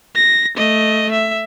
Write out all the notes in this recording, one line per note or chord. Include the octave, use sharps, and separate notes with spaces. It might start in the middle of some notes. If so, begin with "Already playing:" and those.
A#6
A3 D#5
E5